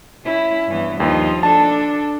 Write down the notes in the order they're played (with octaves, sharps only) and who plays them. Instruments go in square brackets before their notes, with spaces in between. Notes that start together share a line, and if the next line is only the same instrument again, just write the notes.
[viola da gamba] C#4 E4
G2 E3 B3
[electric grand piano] D#2 [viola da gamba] F3 D#4 F4
[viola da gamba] D4 A4 [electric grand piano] A5